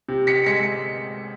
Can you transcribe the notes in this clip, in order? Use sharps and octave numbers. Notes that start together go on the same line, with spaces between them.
C3
B6 C#7
G#3 B6 C#7